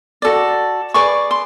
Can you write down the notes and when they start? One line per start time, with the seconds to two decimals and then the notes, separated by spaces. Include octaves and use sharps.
0.22 F#4 A4 D5
0.94 G#4 B4 D5 C#6
1.31 C6